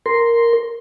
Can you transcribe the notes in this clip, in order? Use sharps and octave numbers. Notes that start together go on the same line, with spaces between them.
A#4 C6